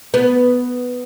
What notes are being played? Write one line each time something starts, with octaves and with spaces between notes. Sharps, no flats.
B3